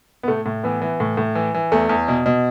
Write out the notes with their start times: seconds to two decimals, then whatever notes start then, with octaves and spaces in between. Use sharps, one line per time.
0.23 B3
0.28 A2 A3
0.46 A2
0.63 E3 B3
0.82 E3
1.00 A2
1.17 A2
1.35 E3
1.54 E3
1.72 E2 A3
1.89 E2
2.08 B2
2.26 B2